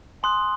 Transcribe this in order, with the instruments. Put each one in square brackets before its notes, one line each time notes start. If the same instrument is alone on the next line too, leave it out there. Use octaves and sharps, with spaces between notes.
[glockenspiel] G#5 C6 D#6 F#6